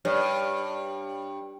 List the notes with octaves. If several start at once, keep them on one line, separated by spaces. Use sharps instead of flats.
G2 C#5 D5